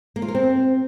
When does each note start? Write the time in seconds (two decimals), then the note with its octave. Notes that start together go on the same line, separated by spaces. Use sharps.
0.16 A#3
0.22 F4
0.28 A#4
0.35 C4